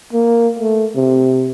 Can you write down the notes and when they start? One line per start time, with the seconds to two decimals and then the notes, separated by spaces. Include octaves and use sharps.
0.13 A#3
0.59 A3
0.96 C3